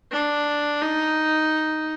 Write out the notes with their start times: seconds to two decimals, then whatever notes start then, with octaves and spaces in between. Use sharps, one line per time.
0.11 D4
0.82 D#4